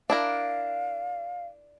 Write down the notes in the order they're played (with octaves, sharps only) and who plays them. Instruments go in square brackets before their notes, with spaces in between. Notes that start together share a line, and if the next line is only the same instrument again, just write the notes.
[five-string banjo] D4 E4 A#4 [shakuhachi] F5